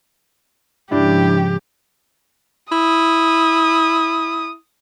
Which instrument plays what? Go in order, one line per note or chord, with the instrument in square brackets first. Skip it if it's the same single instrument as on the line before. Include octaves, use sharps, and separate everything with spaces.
[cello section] G#2 C#3 F3 [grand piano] D4 E4 [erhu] G4
[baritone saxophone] E4 [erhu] D#6